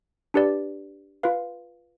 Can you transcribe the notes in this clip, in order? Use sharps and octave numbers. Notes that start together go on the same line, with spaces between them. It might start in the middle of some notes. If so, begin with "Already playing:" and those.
D4 G4 B4 D5
F4 B4 F5